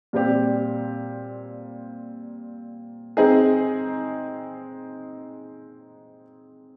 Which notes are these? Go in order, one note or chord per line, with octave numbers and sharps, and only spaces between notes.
A#2 G3 C4 G4
G#3 C4 D#4 G#4